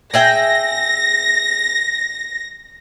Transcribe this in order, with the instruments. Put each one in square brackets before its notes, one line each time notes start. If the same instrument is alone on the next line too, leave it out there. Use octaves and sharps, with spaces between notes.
[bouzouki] G#4 E5 G5 [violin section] A#6